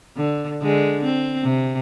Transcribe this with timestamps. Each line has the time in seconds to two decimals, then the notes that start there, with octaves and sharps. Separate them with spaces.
0.17 D3
0.62 D3 G#3
1.04 C4
1.43 C3